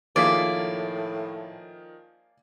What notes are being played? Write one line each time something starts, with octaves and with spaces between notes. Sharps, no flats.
A2 D#3 F3 A#3 F4 G#4 D5 B6